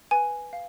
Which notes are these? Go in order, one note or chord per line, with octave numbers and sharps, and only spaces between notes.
B4 G#5
F5